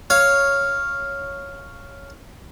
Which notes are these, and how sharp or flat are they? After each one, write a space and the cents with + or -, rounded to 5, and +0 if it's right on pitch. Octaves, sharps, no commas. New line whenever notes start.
C#5 +0 F5 +0